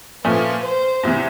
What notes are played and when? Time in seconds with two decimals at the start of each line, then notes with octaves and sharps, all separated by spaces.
0.25 A#2 F3 A3 C#4 B4
0.64 C5
1.03 E2 C3 E3